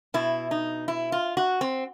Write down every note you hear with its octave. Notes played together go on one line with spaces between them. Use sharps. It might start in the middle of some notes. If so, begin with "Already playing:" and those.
B2 E4
D#4
E4
F4
F#4
C4